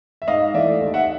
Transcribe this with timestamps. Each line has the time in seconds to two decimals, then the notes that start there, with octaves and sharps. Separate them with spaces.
0.22 E5
0.28 G#2 D#5 F5
0.54 E3 A3 D5 E5
0.81 D#2
0.94 E5 F#5